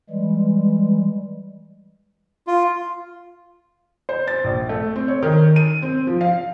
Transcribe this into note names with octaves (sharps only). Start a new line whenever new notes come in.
E3 G3 G#3
F4
C5
A6
A#1
A3
C4
C#5
D#3
D#7
C4
F3
F5